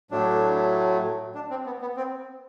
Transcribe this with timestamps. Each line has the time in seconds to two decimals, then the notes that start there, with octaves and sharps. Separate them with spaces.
0.11 A2 F#3 A3 D4
1.35 D4
1.50 C4
1.66 B3
1.81 B3
1.96 C4